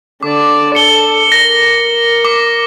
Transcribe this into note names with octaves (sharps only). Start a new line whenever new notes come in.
D3 D5 D6
A4 C#7 G7
A#4 A#6
D6